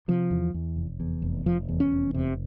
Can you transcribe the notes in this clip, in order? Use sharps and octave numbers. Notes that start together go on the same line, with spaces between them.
C3 F3
E2
E2
F1
E2
F1
F1 F3
E2
C#4
F1
C3